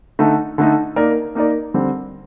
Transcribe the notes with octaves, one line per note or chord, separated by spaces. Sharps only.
D3 A3 D#4
D3 A3 D#4
A#3 D#4 A#4 D5
A#3 D#4 A#4 D5
D3 G3 C4